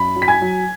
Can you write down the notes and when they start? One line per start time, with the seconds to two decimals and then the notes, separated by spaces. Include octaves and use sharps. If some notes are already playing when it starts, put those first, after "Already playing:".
Already playing: F#2 B5
0.16 F#3
0.22 B6
0.28 G#5 G#6
0.41 F#3